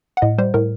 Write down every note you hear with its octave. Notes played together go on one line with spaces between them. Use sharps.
F#5
A2 D#5
G3 C5
A2 A#4